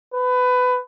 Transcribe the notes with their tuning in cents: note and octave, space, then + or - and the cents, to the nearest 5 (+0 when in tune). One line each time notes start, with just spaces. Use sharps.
B4 +20